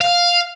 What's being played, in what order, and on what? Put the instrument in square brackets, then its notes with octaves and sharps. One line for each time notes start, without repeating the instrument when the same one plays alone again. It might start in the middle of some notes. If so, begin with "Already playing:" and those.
[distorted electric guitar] F5